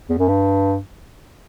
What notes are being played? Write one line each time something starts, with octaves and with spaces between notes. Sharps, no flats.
E2
F#2
G2